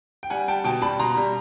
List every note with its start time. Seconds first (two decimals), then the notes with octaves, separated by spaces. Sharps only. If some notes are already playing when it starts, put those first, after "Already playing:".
0.23 G5
0.30 G3 F#5 G#5
0.48 G3 G5 A5
0.64 B2 G5 A5
0.82 G3 A5 B5
0.99 B2 A#5 C6
1.17 G3